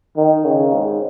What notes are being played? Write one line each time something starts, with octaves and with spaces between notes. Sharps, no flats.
D#3
C#3
G#2